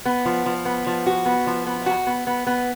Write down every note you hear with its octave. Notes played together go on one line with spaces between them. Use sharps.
B3
F3
F3
B3
F3
F#4
B3
F3
B3
F#4
B3
B3
B3